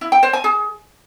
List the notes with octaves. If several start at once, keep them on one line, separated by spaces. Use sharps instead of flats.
E4
G5
C5
G#5
G#4